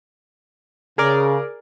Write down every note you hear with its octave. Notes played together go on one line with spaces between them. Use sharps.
C#3 G#4 A#4 D5